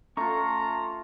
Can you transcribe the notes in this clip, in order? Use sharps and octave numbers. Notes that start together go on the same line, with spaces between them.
A3 C#4 F4 A#5 C#6